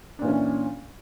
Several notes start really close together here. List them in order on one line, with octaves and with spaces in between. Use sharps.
D4 A#2 E3 C#4